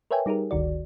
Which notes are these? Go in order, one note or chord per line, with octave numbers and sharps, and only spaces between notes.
A#4 B4 C#5 E5 G5 G#5
G3 D#4 G4 G#4 A#4
G1 D2 D#3 F#4 D5